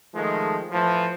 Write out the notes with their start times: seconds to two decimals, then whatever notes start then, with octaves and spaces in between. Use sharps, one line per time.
0.14 D#3 F3 G#3 A3
0.71 A2 E3 F3